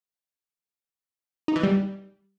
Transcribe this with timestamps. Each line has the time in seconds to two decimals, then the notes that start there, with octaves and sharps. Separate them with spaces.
1.48 D#4
1.56 E3
1.63 G3